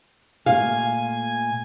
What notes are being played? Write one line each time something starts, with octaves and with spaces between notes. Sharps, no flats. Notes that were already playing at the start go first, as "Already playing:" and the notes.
A#2 A3 F5 G#5